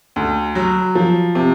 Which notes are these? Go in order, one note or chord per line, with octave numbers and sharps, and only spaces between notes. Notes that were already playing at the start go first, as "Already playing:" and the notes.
D2
F#3
F3
C3